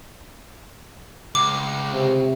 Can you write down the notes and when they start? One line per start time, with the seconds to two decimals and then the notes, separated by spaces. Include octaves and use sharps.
1.35 C#2 D6
1.93 C3